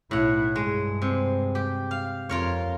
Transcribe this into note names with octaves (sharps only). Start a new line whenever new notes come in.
B1 A2 E4 F#5
G2 G#3
C3
G4
F5
F2 F4 A#4 C#5